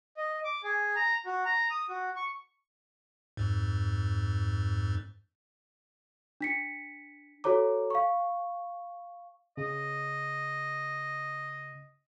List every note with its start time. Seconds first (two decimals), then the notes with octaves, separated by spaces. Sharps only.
0.17 D#5
0.44 D6
0.64 G#4
0.96 A#5
1.26 F#4
1.45 A#5
1.71 D#6
1.89 F#4
2.16 C#6
3.37 F2 G#2
6.41 D4 B6 C#7
7.44 F#4 A4 C#5 A#5 D6
7.90 F5 C#6
9.57 C#3 D#5